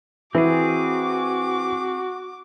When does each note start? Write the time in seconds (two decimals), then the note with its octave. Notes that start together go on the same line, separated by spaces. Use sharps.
0.35 E3 C4 F#4 G#4 D6